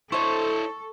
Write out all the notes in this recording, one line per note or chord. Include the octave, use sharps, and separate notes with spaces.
E4 A4 C5 C#5 D#5 C#6